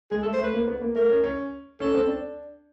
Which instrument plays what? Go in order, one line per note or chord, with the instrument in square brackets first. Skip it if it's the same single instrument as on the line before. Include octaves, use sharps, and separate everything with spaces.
[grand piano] G#3 [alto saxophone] G#4
[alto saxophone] A4
[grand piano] A3
[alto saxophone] C5
[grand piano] A3
[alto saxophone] B4
[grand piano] A#3
B3
A#3
[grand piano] A3 [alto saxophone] A#4
[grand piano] C#4
C#4
[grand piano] C#4 [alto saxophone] A4
[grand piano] C4
D4